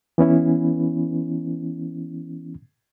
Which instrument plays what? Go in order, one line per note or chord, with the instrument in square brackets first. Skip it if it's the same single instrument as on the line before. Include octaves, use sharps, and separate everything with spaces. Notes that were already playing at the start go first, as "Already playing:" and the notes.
[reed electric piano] E3 B3 C#4 E4